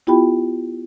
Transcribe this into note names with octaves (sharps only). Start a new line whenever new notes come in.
B3 E4 F4 G4 G5 B5